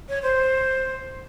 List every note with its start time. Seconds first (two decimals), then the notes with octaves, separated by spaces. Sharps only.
0.08 C#5
0.22 C5